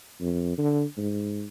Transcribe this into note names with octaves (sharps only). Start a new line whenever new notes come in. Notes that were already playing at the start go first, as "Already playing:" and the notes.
F2
D3
G#2